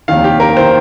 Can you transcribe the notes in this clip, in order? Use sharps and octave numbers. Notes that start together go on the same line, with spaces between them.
F1 D#2 D#3 F5
G4
A#4
D#3 C5